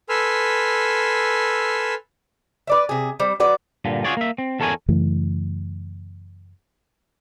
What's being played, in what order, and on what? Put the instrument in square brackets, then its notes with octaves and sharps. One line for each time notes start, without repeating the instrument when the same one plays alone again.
[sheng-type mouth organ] A4 B4 G#5 C6 E6 F6
[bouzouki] B4 D5 E5
C3 G#4
G3 C4
F#3 F#4 B4 D5
[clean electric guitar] G2 A#2 D3
F4 F#4 G#4 C#5 D5
A#3 E5
C4
E2 A4 A#4 C#5 G#5
[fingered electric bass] F#2 C#3 E3 A3